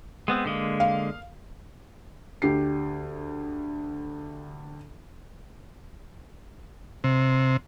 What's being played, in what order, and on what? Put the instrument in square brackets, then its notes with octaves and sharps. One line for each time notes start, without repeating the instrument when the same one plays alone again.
[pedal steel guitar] G#3 B3 C4
D3 G#3 A#3
[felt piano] F5
D2 G4 C7
[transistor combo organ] C3